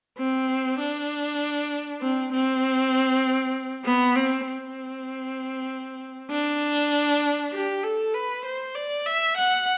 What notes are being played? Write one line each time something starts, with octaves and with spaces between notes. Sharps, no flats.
C4
D4
C4
C4
B3
C4
C4
D4
G4
A4
B4
C5
D5
E5
F#5